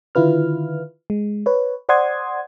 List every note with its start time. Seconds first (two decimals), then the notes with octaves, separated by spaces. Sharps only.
0.15 D3 D#3 E4 F4 B4 F6
1.10 G#3
1.46 B4 C#5
1.89 C5 D5 F#5 C6 D#6 G#6